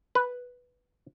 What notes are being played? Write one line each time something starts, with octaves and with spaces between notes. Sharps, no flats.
B4